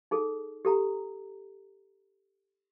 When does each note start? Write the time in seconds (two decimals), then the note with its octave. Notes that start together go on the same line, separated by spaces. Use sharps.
0.11 D#4 G#4 A4
0.65 G4 A4 A#5